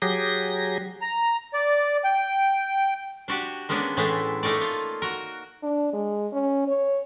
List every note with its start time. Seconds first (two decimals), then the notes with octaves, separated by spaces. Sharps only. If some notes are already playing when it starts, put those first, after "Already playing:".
0.02 F#3 G4 G#4 A#6
1.02 A#5
1.54 D5
2.04 G5
3.28 D4 F#4 G4
3.69 G#3 A#3 B3 C#4 D4
3.97 A2 E3 G#3 A3
4.43 A3 A#3 D#4 C#5 D5
4.61 F4
5.02 F#4 A#4
5.63 D4
5.93 G#3
6.32 C#4
6.68 C#5